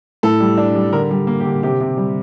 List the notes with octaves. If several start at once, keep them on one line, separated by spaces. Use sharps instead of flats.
A2 A4
G3
D4
G3
D3 A#4
G3
A#3
G4
D3
C3 G4
C3
G3